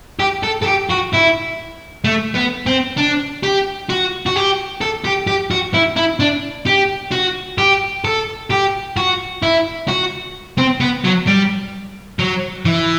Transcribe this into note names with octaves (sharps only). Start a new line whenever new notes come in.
G4
A4
A4
G4
F#4
E4
A3
B3
C4
D4
G4
F#4
F#4
G4
A4
G4
G4
F#4
E4
E4
D4
G4
F#4
G4
A4
G4
F#4
E4
F#4
C4
B3
F#3
G3
F#3
E3